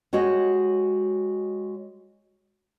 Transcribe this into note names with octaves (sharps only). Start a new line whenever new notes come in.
G#3 F#4 G4 C#5 D#5